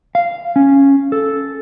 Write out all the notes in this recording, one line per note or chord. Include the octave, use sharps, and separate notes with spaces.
F5
C#4
A4